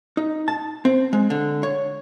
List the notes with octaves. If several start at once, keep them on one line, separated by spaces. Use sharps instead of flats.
D#4
A5
C4
G#3
D3
C#5